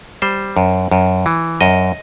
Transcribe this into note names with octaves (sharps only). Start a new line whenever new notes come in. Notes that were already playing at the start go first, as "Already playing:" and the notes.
G3 C5
F#2
F#2
E3
F#2 D#5